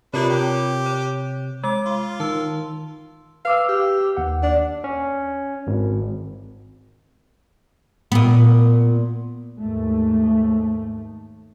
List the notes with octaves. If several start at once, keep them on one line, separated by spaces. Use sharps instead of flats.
C3 D4 F4 A#4 B4 C#5
G4
C#5
G#3 D6
F4
D#3 A5 E6
B4 F5 D6 E6
G4
D#2 F#5
D4
C#4
G#1
A#2 B3
D#2 G#2 A3